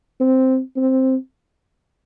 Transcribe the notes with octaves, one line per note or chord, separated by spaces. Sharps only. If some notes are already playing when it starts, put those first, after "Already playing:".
C4
C4